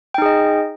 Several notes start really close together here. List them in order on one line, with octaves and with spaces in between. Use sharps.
G5 D#4 G#4 D#5